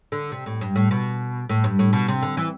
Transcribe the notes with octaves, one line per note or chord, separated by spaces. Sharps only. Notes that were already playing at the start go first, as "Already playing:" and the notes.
D3
C3
A2
G2
A2
B2
A2
G2
A2
B2
C3
D3
E3